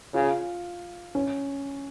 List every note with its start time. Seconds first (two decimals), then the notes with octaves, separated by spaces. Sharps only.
0.14 C#3 F4
1.15 C#4